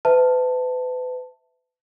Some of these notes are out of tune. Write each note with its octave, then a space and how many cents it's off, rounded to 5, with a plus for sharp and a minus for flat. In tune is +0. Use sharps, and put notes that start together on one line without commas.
B4 +35 E5 +0 A5 +10